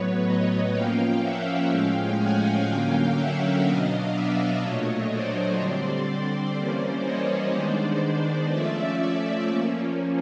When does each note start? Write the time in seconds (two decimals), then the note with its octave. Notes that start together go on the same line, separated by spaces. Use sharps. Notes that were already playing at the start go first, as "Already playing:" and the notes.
Already playing: A2 F#3 B3 B4 C#5
0.25 C#5 D#5
0.72 F3 A#3 C#4 F5 G5
1.21 E5 F#5
1.70 A2 F3 G#3 C#4 F5 G5
2.18 F#5 G#5
2.67 D3 F#3 A#3 C#4 F5 G5
3.15 E5 F#5
3.64 B2 F#3 B3 D4 D#5 F5
4.13 D5 E5
4.62 A#2 F#3 A3 D4 C#5 D#5
5.10 C5 D5
5.59 D3 G3 C4
6.56 E3 G3 A#3 C#4 C5 D5
7.05 C#5 D#5
7.53 D#3 G#3 B3 D4 C5 D5
8.02 C5 D5
8.51 F3 A3 C#4 D5 E5
9.00 D5 E5
9.48 F3 A#3 C#4